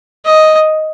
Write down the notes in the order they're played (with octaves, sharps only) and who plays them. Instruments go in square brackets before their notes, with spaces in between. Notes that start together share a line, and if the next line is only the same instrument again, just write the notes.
[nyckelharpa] D#5